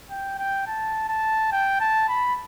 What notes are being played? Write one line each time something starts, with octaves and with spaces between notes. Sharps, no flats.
G5
G5
A5
A5
G5
A5
B5